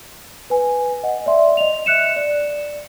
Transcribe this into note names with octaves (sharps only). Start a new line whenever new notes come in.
B4 G#5
D#5 F#5
D5 E5 C6
D#5 F7
E5 F#6 C#7 E7
D5